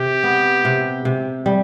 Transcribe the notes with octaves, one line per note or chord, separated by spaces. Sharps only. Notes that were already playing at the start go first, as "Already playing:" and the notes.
Already playing: C3 G4
B3
C3
C3
G3